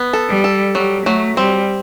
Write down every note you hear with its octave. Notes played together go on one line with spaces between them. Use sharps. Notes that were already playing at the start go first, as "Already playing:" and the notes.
Already playing: B3
A4
G3
A4
F#3 G3
F#3 A3
G3 C4